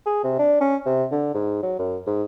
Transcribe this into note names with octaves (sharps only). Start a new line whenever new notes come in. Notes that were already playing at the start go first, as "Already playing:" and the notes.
G#4
C3
D4
C#4
C3
D3
G#2
F#3
F#2
G#2